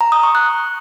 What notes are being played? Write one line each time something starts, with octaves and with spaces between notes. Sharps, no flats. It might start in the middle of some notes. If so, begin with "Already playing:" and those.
A#5
D#6
C#6
F#6